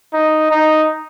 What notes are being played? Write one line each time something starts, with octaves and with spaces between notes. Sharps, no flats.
D#4
D#4